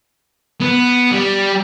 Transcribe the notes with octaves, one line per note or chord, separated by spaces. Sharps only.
B3
G3